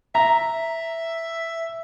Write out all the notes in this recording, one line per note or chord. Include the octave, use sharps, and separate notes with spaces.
E5 A#5